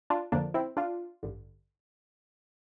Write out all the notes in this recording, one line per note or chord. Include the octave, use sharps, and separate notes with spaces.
D4 F4
F2 D3 F3 A#3 D4
C4 E4
D4 F4
A1 G2 D3